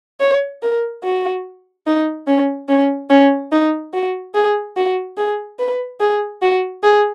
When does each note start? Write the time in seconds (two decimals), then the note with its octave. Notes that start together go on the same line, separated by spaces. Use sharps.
0.20 C#5
0.62 A#4
1.03 F#4
1.86 D#4
2.27 C#4
2.69 C#4
3.10 C#4
3.51 D#4
3.93 F#4
4.34 G#4
4.76 F#4
5.17 G#4
5.59 B4
6.00 G#4
6.42 F#4
6.83 G#4